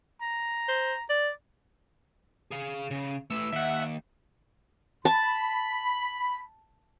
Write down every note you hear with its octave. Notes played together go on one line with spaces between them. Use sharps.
A#5
C5
D5
G#4 F5
C#3
A3 B4 E6
D#2 E5 F#5
A5 B5